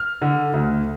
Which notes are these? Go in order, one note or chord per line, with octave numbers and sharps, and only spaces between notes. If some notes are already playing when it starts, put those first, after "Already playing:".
Already playing: F6
D3
D2